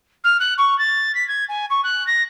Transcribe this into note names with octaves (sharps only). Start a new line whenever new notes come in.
F6
F#6
C#6
A6
B6
G#6
G#5
C#6
F#6
A#6